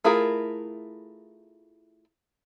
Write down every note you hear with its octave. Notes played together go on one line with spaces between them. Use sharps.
A3 E4 F4 G#4 A#4